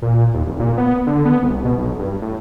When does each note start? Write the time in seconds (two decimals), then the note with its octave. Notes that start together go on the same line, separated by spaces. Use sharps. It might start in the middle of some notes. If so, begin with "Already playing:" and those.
0.02 A#2
0.34 D#2
0.47 F1
0.60 A#2
0.77 B3
1.06 D3
1.25 B3
1.42 C2
1.65 B2
1.78 B1
1.99 G2
2.22 A2